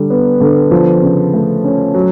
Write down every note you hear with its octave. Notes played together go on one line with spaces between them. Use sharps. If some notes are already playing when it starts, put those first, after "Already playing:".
Already playing: D3 G3
B3
D3
F3
C#3
A3
C#4
F#3